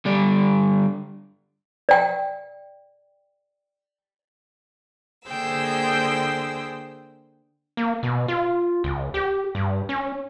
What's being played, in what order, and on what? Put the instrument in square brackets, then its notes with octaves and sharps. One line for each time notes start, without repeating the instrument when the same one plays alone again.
[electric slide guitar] D3 G3 D5
[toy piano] D5 G5
[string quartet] D3 A#3 G#4 C5 G5 E6
[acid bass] A#3
B2
F4
C#2
G4
G2
C#4